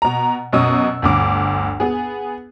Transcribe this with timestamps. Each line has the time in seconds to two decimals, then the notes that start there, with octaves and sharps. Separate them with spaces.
0.02 B2 A#5
0.53 F#2 B2 C#4 D#5 D#6 E6
1.02 G1 D2 D6
1.80 B3 G#4